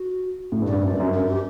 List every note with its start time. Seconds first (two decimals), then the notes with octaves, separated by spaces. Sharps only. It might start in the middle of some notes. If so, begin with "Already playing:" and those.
Already playing: F#4
0.52 A2
0.62 G2
0.67 D5
0.72 G2
0.83 F#2
0.91 G2
0.99 F#2
1.08 G2
1.13 F#2 A#4
1.28 G4